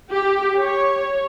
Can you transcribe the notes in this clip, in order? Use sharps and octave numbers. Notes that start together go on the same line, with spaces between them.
G4
C#5